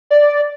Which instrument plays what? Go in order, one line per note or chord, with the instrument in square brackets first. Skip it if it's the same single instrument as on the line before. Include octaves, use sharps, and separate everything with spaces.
[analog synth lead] D5